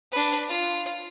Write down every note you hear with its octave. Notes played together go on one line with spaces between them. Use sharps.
D4 B4
F4